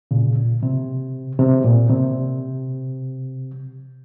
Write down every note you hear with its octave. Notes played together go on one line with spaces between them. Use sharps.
A#2 C#3
A#2
C3
C3
A#2
C3